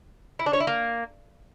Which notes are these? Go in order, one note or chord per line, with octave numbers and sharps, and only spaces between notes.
E4
D4
C#5
E4
A#3